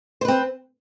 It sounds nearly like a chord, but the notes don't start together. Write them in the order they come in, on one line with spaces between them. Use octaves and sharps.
C5 B4 C4